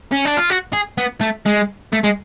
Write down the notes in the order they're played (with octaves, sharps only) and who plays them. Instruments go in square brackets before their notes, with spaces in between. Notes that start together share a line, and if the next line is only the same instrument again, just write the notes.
[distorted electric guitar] C#4
D4
F4
F#4
G#4
B3
A3
G#3
A3
G#3